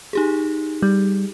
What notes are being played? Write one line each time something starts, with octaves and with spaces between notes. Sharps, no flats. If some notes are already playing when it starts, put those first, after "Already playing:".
D#4 G4 G#4
G3